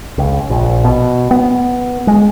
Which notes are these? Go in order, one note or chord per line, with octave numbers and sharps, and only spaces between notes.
C#2
A#1
B2
B3
G#3